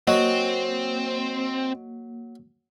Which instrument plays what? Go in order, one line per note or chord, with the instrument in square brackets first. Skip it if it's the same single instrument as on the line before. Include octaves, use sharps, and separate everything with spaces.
[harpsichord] F#3 [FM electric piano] A#3 [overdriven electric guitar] C4 [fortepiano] D#5